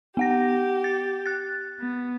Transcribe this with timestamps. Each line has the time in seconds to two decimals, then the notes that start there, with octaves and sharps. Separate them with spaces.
0.17 B3 G4 F#5 A#6
0.84 A6
1.26 F#6 A6
1.80 B3